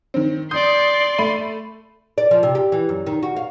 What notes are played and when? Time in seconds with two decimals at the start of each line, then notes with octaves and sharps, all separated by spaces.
0.14 D#3 C4
0.51 D5 C6 D#6 G6
1.18 A3 B5 D#7
2.18 D5
2.31 F3
2.43 C3
2.55 G4
2.72 E3
2.89 F#2
3.06 D#3
3.23 F#4
3.36 F5